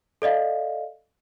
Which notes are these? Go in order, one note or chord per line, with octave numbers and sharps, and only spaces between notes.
A4 D5 D#5 F5